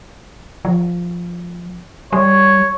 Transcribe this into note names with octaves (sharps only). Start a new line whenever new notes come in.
F3
G3 C#5